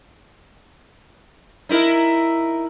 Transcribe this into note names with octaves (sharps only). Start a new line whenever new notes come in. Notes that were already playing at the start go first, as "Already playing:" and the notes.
D#4 E4 A#4